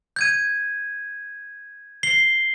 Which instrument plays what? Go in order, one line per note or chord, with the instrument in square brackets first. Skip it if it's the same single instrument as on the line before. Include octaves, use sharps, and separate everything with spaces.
[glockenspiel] G6 G#6 D#7
C7 G7